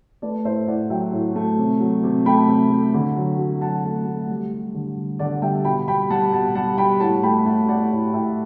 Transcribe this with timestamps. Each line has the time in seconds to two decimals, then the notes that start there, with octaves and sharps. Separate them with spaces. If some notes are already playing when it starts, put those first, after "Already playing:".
0.22 A3 B4 D5
0.45 A2 C5 E5
0.68 A2 D5 F#5
0.90 F#3 E5 G5
1.13 A2
1.36 A3
1.58 C3
1.81 F#3
2.03 C3
2.26 A3 G5 B5
2.48 C3
2.71 A3
2.94 D3
3.16 F#3
3.39 F#3
3.61 F#3 F#5 A5
3.84 A3
4.06 A3
4.29 G3
4.52 G3
4.74 D3
4.97 G3
5.19 D3 D5 F#5
5.42 G3 E5 G5
5.65 B2 G5 B5
5.88 G3 G5 B5
6.10 G3 F#5 A5
6.32 B2 F#5 A5
6.55 G3 F#5 A5
6.78 G3 G5 B5
7.00 A2 F#5 A5
7.23 A3 G5 B5
7.46 A3 F#5 A5
7.68 A3 D5 F#5
7.91 A2
8.13 A2 E5 G5